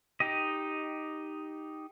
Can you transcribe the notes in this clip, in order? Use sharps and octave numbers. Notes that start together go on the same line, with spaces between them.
D#4 G4 D#5